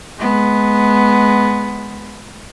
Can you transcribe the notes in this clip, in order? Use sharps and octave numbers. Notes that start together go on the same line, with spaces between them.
G#3 B3